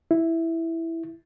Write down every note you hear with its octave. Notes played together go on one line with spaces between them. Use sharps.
E4